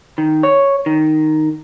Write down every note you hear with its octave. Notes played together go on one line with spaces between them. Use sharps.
D#3
C#5
D#3